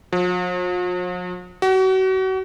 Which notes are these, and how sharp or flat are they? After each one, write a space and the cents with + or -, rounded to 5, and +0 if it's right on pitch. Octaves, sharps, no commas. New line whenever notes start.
F3 +45
F#4 +35